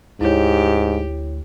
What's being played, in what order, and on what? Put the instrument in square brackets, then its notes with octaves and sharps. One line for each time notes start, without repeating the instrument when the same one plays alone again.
[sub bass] D2 [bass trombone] G#2 [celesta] E4 C#5 [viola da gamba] G4